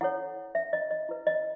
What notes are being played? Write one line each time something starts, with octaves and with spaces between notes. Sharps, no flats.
E4 A4 C#5 F#5
E5
D#5
D#5
E4 B4
D#5